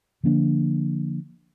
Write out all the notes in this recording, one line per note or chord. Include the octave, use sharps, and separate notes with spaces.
D3 F3 A#3 D4